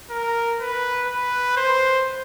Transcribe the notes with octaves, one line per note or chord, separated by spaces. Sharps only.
A#4
B4
B4
C5